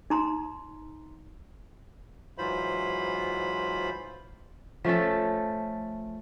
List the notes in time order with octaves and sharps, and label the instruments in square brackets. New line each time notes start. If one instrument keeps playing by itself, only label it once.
[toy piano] D#4 A#5 C6
[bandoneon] G#2 E3 F#3 F4 C5 B5
[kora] F3 A3 C#4 A4